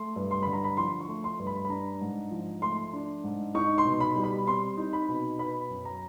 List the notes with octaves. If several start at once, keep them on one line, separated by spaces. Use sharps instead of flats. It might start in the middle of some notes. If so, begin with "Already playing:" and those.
Already playing: A3 C6
G2
C6
D3 B5
A#5
B5
F3 C6
C#6
A3
C6
G2
B5
B5
D4 A#5
G#2
F3
A3 C6
D4
G#2
D#4 C#6
C6
B2
B5
G3
B5
C4 C6
D#4
B5
B2
B3 B5
F#2
A#5